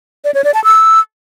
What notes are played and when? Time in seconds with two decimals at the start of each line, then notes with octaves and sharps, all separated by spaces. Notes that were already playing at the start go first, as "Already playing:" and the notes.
0.25 D5
0.34 C#5
0.44 D5
0.54 A5
0.64 E6